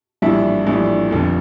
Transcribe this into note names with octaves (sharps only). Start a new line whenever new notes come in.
A#1 A2 E3 G3 D4 E5
A#1 A2 E3 G3 D4
F1 F2 D3